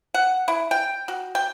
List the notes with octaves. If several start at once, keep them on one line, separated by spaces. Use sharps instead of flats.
F#5
E4
G5
F#4
G5